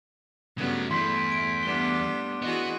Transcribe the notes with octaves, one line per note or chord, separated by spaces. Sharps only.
G2 C#3 F#3 A3 B3
E2 A3 E4 C6 G6 B6
D7
G3 B3 D4 G7
E3 B3 F#4 G#4 D#5